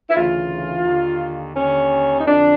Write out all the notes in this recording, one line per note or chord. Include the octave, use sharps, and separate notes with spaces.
E4
D2 C#3 E3 F4
D#2 D3
D#2 D3 C#4
D#4
F2 D3 D4